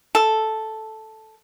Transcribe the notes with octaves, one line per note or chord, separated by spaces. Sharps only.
A4